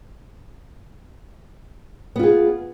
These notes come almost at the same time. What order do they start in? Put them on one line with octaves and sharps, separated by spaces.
B3 F4 G#4